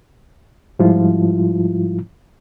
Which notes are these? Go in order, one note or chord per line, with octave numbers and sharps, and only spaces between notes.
G#2 F3 G3 E4 F4